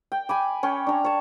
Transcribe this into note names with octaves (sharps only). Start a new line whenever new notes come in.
G5
G#5 B5 D6
C#4 C#5 G5
D4 A#5
C#5 A5